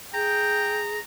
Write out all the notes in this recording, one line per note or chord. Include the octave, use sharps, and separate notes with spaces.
G#4 G5 A#5